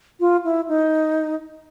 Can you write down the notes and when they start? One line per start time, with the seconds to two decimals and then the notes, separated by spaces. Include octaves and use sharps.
0.20 F4
0.44 E4
0.68 D#4